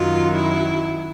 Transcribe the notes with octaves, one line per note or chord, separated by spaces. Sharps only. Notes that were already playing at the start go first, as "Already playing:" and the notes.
Already playing: F#2 D#3 F#3 F4
E4